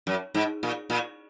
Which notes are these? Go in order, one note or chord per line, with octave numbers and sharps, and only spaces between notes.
F#2
G#2
A#2
A#2